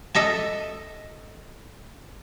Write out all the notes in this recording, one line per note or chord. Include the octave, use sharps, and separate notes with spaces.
A4 D#5 E5 A5